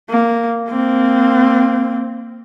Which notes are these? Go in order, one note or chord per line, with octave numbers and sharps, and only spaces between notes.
A#3
A#3 C4